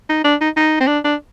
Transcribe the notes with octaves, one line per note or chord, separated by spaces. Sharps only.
D#4
D4
D#4
D#4
C4
D4
D4